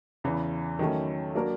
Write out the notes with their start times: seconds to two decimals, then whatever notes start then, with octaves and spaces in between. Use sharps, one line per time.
0.24 E2 C#3 E3
0.79 D#3 F#3 A3 C#4
1.35 F#3 A#3 D4 F#4 A#4